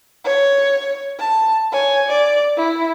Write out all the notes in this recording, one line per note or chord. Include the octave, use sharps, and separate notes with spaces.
C#5
A5
C#5 G#5
D5
E4